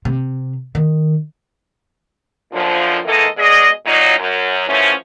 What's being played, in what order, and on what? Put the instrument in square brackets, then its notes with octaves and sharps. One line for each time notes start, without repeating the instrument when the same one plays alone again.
[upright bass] C3
D#3
[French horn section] F#2 A#2 D3 F3
D#3 E3 G#3 A#3 A4 D#5
B2 G#3 G#4 D5 D#5
A#2 F#3 D#4
F#2
F#2 E3 F3 A3 C#4